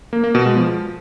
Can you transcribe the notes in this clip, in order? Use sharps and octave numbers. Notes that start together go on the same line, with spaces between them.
A#3
A#3
B2
G#3
F3